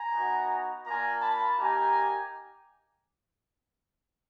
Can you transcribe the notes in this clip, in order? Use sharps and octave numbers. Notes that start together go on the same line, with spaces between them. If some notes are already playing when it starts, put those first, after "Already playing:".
Already playing: G#5 A#5
B3 D#4 F#4
A#3 D4 F4 G#5 A#5
A5 B5
A#3 D#4 G4 G#5 A#5